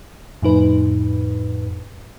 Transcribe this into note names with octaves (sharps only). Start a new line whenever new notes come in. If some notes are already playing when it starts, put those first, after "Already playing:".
F2 A2 D#4 B4